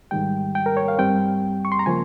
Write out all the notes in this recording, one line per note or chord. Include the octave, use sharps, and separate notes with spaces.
G#2 D#3 G3 G5
G5
A#4
C#5
F5
G2 G3 C4 G5
C#6
C6
A#5
C#3 F3 A#3 G#5